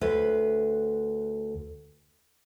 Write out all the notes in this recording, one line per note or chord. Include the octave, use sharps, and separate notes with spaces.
D2 B4 C5